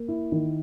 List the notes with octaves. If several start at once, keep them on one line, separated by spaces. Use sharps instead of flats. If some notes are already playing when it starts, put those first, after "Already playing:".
Already playing: A#3
E4
D#3